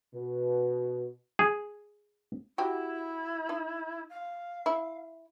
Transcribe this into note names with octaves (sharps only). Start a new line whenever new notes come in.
B2
G#4
E4 F#4 G4
D#4
F5
E4